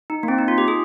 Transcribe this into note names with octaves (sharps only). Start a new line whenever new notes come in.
D#4
A#3
C4
D#4
F4
G4
G#4